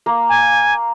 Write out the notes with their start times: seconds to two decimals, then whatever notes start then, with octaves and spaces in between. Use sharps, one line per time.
0.06 A#3
0.29 G#5